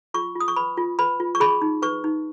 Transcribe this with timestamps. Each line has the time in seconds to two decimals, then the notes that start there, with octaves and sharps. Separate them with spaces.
0.14 F4 C#6
0.36 F4 D#6
0.48 C#6
0.56 B4 B5
0.77 F4
0.99 B4 B5
1.20 F4
1.35 C#6
1.40 G#4 B5
1.62 D#4
1.82 B4 C#6
2.04 D#4